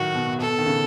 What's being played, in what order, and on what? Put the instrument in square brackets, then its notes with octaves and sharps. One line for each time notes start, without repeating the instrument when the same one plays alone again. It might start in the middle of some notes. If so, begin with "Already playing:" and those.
Already playing: [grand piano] A2 D#3 F#3 [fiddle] F#4
[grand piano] B2
[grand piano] B2 [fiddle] A4
[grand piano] D#3
C#3